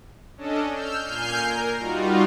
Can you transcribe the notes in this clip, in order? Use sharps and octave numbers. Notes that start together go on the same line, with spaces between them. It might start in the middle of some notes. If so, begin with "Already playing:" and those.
C#4 D4 A4 D#5
E6 F6 G6
A#2 G#5 F6 G6 C7
A#4
G3 D#4 F4 F#4